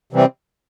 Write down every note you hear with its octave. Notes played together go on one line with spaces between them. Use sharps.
C3 E3 G3 C4